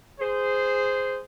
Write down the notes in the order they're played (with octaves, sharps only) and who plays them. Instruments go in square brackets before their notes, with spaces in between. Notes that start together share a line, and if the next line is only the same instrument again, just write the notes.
[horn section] G#4 C5